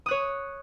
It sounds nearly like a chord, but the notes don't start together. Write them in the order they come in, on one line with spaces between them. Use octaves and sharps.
D#6 F#6 C#5